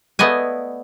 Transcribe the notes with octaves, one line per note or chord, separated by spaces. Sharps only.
A3 B3 D5 D#5 G#5